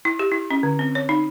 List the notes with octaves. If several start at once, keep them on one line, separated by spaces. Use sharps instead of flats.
E4
G4
E4
C#4
D3
C4
C#5
D#4